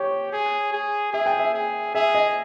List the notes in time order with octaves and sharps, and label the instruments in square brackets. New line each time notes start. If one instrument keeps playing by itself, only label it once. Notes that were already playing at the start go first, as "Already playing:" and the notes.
Already playing: [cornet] G4 [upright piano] C#5
[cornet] G#4
G#4
[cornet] G#4 [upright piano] E5
[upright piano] G5
E5
[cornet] G#4
[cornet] G#4 [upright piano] E5
[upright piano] D#5